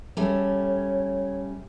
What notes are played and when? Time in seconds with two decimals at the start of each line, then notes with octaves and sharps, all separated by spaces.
0.17 G3 A3 C#4 C#5